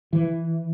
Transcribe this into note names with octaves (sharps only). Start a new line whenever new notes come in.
E3